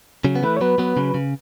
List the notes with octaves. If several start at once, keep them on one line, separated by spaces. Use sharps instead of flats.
C#3 F#3
B3
E3 A3 B4
C#5
F#3 B3 B4
F#3 B3
C#3 F#3
C#3